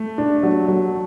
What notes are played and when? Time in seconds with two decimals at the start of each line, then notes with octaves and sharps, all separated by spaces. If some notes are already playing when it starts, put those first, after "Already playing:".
Already playing: A3
0.18 D4
0.43 F#3
0.68 F#3